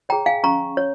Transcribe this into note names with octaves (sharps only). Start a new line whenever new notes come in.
G#4 C#5 G5 A#5
F5 G#5
C#4 A#5 C#6
C#5